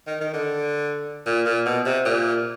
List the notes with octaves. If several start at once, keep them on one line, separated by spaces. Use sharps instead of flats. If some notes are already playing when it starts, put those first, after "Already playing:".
D#3
D#3
D3
A#2
A#2
B2
C3
A#2